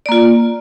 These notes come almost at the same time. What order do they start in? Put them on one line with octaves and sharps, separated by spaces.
D5 A#3 F4